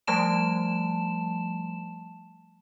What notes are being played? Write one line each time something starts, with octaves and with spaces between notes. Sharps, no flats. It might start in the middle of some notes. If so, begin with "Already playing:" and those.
F3 G3 A3 A5 E7